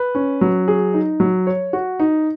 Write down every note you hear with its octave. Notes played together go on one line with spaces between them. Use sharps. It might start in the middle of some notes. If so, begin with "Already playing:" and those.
Already playing: B4
C#4
F#3
G#4
D#4
F#3
C#5
F#4
D#4